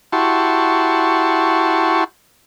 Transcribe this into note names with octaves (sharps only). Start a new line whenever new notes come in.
E4 F#4 G4 A5 C6 C#6